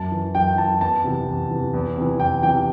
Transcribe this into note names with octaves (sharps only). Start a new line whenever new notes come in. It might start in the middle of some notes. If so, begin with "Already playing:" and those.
Already playing: F#2 A5
E3
F#2 G5
G5
E3 A5
E2 A5
C3 E3
E2
C3 E3
E2
C3 E3
E2 G5
C3 E3 G5